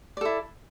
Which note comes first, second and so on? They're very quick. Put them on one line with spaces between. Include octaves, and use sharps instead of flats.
D5 A4 E4